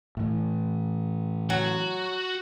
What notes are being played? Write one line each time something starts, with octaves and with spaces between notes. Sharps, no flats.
A2 E3
F#3 F#4